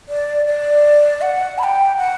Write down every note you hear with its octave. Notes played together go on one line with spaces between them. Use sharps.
D5
D5
F#5
B5
G5
F#5